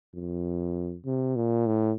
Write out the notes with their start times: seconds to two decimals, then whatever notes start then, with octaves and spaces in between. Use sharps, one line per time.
0.14 F2
1.06 C3
1.36 A#2
1.67 A2